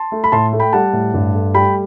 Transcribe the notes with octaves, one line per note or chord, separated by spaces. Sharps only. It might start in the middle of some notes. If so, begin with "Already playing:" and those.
Already playing: A5 C6
A3
B5
A2 A5 C6
A3
G5 B5
G3 F#5 A5
A2
G2
A3
G3 G5 B5